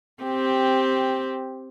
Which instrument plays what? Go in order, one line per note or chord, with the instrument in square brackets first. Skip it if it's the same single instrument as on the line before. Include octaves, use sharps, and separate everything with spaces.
[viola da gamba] C4 G4